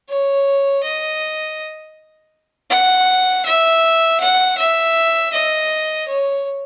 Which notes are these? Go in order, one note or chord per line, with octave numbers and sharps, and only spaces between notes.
C#5
D#5
F#5
E5
F#5
E5
D#5
C#5